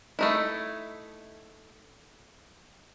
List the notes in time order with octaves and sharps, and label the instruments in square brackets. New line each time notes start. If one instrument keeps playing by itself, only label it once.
[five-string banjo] A3 D#4 E4